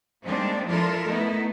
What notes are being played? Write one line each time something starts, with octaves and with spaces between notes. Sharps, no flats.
G3 G#3 A#3 C4 D4 D#4
F3 D4 E4 F4 A4 A#4
A3 B3 D#4 E4